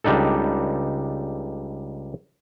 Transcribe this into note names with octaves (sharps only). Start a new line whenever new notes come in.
C#2 G3 D4 D#4 A4